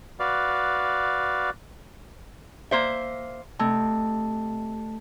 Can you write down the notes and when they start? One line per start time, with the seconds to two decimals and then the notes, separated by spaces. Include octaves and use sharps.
0.20 F#4 B4 D5 F5
2.71 A#3 C5 E5
3.59 C3 A3 A5